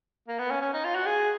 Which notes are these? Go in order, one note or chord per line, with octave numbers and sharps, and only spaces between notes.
A#3
B3
C#4
C#4
D#4
F4
F#4
G#4